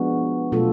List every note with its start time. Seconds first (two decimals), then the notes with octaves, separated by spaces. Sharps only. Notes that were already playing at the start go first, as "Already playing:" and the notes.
Already playing: F3 G#3 B3 D4 F#4
0.52 B2 F#3 A3 F4 A4